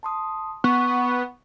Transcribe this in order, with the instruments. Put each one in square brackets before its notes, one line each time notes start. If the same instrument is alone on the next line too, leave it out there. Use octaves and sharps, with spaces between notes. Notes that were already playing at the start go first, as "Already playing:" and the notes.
[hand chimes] A5 C6 D#6
[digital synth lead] B3 [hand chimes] C#6